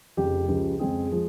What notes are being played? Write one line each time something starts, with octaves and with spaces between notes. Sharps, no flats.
F1 F2 C#3 G4
C#2 C#3 F3
F2 C#3 G#3 C4 G#4
F3 G#3